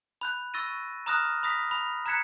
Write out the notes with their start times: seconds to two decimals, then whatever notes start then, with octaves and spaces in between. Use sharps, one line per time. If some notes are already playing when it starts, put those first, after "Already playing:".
0.21 B5 F#6 G6
0.54 C#6 E6 A6 A#6 D#7
1.06 A#5 B5 D#6 F6 F#6 A#6
1.43 B5 D#6 A#6 B6
1.71 B5
2.06 A#5 F#6 G#6 B6 C#7 E7